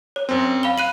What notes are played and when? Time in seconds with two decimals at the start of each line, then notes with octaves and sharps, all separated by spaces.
0.16 C#5
0.29 F#2 C4
0.63 F5 B5 G7
0.78 F5 F#6 D#7 F#7